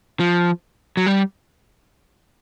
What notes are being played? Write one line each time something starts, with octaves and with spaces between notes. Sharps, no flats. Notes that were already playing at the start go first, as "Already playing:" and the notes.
F3
F#3
G3